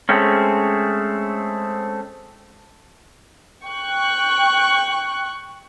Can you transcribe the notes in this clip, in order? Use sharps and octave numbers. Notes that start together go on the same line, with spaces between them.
G#3 A3 C4 C#4
G5 C#6 F#6